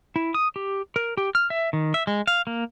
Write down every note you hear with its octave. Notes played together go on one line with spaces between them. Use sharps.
E4
D#6
G4
A#4
G4
F6
E5
D#3
E5
G#3
F5
A#3